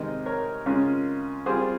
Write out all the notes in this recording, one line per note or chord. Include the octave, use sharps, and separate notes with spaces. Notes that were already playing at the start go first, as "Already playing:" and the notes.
Already playing: C3 D#3 G#3 D#4 C5 D#5
A#4 C#5
C#3 G#3 C#4 F4
G3 C4 F4 G#4 C5